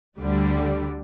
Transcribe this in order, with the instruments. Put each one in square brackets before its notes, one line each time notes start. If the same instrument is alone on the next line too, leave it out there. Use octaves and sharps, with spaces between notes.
[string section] D2 D3 G3